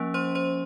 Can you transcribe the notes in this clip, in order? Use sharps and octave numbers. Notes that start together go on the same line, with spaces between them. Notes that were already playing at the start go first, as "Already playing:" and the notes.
Already playing: F3 A#3 C#4
C5 C6
C5 C6